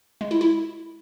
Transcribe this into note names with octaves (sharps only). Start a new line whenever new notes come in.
G#3
E4
E4